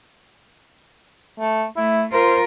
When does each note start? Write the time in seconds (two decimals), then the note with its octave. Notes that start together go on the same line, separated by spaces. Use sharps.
1.39 A3
1.77 A3 E4
2.13 F4 A#4 C5